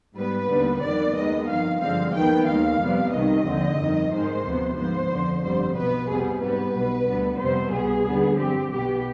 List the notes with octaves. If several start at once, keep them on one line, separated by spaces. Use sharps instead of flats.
G#2 G3 B3 B4
D#2 D3 G3 B3
G1 F2 D#3 B3 D5
D#2 D#3 G#3 B3 D#5
G1 F2 D#3 F5
G2 D3 F3 G#3 C4 F5
D#2 D#3 B3 G5
D#2 D#3 G#3 F5
F2 C3 G3 B3
C2 C3 D#3 D#5
D#2 D3 F3 C4
G1 F2 D#3
G#2 D#3 G#3 C5
D2 C3 F3 B3
G#2 F3 B3 C5
F2 D3 F3
G1 F2 D3 G3 C5
B1 B2 B3 B4
F2 C3 G3 B3 G#4
G#2 G3 B3 B4
B1 B2 B3
D2 D3 G3 B3
F2 C3 G3 B3 C5
C2 B2 G3 B3 G#4
D#2 D3 G3 B3
G2 F3 C4 G4
B1 B2 B3 G4